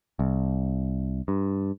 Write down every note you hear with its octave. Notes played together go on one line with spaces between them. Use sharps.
C2
G2